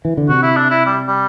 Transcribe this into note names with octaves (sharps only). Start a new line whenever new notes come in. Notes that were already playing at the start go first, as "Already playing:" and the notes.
E3
D3
C3 F#4
E4
D4
E4
G3
G3